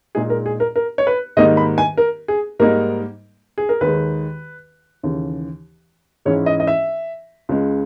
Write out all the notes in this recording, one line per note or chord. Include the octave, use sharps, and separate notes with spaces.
A#2 G#3 D#4 G#4
A#4
G#4
A#4
A#4
C#5
B4
G#2 D#3 G3 A#3 D#4 D#5
B5
G#5
A#4
G#4
G#2 G3 A#3 D#4 A#4
G#4
A#4
D#2 D#3 G#3 B4
D#2 C#3 E3
G#2 E3 G#3 C#4 E4 C#5
D#5
D#5
E5
C#2 C#3 G#3